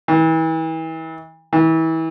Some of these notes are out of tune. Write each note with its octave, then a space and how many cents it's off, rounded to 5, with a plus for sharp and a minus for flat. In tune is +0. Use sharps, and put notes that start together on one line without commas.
E3 -35
E3 -30